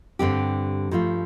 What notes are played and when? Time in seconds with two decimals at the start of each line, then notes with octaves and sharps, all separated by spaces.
0.19 G2 D3 G3 C4 G4
0.91 G2 F3 A3 F4